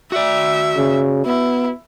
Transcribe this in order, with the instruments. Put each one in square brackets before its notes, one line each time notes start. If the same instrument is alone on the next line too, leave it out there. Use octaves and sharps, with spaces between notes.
[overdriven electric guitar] F#4 D5 [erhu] E5
[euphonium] C#3
[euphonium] B3 [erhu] E4